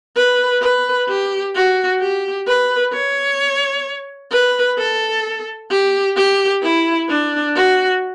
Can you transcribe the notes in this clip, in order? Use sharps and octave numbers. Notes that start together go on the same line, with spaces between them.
B4
B4
G4
F#4
G4
B4
C#5
B4
A4
G4
G4
E4
D4
F#4